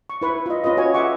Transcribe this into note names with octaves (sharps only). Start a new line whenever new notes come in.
C#6
E4 B4 C#6
F4 D#5
C#4 F4 B4 D#5
F#4 C#5 G#5
G#4 E5 F#5 C#6 D6